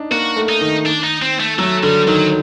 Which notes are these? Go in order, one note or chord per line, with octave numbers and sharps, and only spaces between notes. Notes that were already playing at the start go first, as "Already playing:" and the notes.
Already playing: D4 D#4
A#3 F#4
A3
D#4
D#3
D4
D#4
C4
A3
F#3 A3
D3 G3
D#3 F#3